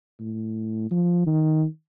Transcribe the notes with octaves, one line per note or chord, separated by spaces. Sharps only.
A2
F3
D#3